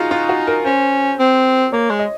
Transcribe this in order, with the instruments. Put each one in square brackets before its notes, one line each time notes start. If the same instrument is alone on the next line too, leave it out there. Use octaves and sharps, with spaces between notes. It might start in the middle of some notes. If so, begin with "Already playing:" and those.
Already playing: [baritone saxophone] D#4 [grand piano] F4 F#4 G#4
[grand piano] F4
F#4
A#4
[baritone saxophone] C#4 [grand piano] C5
[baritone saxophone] C4
[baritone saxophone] A#3 [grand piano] C#5
[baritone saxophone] G#3
[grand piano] D#5